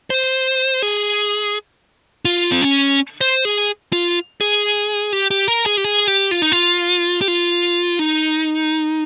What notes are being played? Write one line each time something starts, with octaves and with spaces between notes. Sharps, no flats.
C5
G#4
F4
C4
C#4
C5
G#4
F4
G#4
G4
G4
A#4
G#4
G4
G#4
G4
F4
D#4
F4
G4
F4
D#4